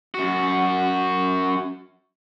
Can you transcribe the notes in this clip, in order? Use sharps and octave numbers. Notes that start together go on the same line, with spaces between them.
F#2 F#4